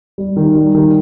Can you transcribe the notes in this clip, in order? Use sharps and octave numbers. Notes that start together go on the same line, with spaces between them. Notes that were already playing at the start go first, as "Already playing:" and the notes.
G3
D#3
G3
D#3